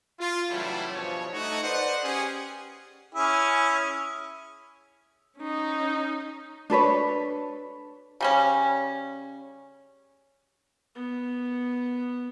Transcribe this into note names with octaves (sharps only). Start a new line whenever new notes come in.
F4
C#3 E3 F#3 G3 A3 E4
G2 B2 F3 C#5
A3 D#4 F#4
B4 C5 D5 D#5 F#5
C#4 G4 G#4
C#4 E4 G#4
C#4 D#4
D4 A4 B4 C#5
C#3 G3 C#4
B3